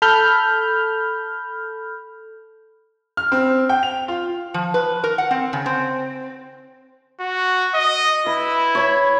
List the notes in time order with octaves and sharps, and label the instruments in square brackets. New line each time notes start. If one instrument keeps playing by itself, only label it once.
[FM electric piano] A4 B5 F6 G6
[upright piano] F6
C4
G5
F7
F4
[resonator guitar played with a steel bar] F3
B4
A#4
F#5
C4
C#3
C4
[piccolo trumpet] F#4
D#5
[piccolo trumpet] E4 [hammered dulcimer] B4
[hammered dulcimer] C#5 B5